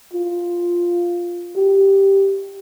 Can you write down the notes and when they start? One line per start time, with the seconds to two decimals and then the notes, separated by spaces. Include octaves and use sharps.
0.13 F4
1.56 G4